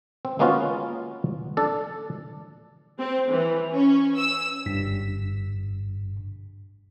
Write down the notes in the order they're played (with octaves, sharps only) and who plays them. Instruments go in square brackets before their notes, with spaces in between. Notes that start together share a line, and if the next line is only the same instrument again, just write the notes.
[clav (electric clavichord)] C4
G#3 A#3 B3 C#4 F4 F#4
D4 A4
[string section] C4
E3
C#4
E6
[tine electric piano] G1 G2 B6